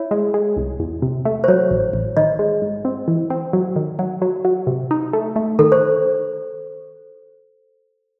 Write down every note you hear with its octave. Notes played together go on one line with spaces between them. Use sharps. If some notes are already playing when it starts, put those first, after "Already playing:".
Already playing: E4 C#5
G#3
G#3
C2
E2
C3
A3
C5
F#3 C#5
A1
A1
D#3 D#5
G#3
G#2
C4
E3
C4
F#3
D#3
F#3
F#3
F#3
C3
D#4
A3
A3
D#3 A4
C5